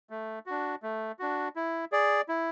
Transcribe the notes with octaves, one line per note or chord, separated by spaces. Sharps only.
A3
D4 F#4
A3
D4 F#4
E4
G#4 D5
E4